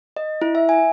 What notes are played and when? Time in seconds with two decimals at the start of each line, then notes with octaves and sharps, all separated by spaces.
0.17 D#5
0.42 E4
0.55 E5
0.69 G#5